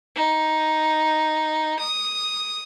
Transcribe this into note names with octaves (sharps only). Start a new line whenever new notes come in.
D#4
D#6